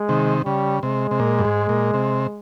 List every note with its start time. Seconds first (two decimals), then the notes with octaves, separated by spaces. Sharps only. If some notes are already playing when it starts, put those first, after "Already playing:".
Already playing: G#3
0.09 C3 D#3
0.45 C#3 G3
0.83 C3 G#3
1.11 C3
1.19 A#2
1.39 G2
1.45 G#2
1.69 A#2
1.94 C3